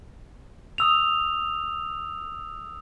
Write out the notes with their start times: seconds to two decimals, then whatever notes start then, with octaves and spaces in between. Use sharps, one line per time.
0.78 D#6 E6 F7